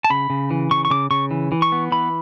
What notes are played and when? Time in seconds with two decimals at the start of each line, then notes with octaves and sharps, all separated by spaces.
0.04 A5
0.10 C#3 B5
0.30 C#3
0.51 E3
0.71 C#3 C#6
0.85 C#6
0.90 C#3 D6
1.11 C#3 C#6
1.31 E3
1.52 E3
1.62 C#6
1.72 B3
1.92 E3 B5